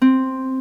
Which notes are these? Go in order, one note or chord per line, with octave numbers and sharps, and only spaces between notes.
C4